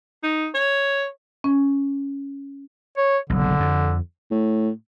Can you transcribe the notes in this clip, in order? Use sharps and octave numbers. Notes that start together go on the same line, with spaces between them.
D#4
C#5
C#4
C#5
F#1 B1 D3
F2
A2